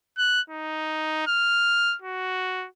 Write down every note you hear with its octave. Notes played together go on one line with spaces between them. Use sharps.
F#6
D#4
F6
F#4